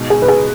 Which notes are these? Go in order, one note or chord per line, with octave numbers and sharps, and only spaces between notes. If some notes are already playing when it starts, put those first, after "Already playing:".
Already playing: B2 G#3 D#4
G#4
B4
G#4